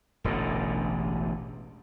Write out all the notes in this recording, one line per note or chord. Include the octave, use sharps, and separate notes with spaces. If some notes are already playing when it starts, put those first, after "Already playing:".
E1 A1 B2 D3